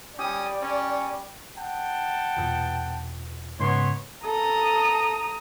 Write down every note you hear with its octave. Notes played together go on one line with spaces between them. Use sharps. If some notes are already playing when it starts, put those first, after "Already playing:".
G3 C#4 G4 D5 D#6
C#4
F#5 G5 A5
A#1 E2 B2
G#2 C#3 B3 C#5 C6
A4 A#5 D#6